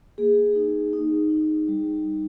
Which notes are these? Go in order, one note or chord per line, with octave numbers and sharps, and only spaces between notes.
A#3 G#4
D#4
D#4
D#4
G3
G3